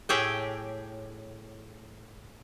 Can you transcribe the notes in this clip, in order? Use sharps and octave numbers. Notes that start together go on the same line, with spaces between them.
A2 G4 G#4 C#5 E5 G5